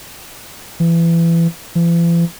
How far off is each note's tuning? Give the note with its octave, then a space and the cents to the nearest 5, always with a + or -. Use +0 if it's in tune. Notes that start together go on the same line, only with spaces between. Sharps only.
E3 +25
E3 +45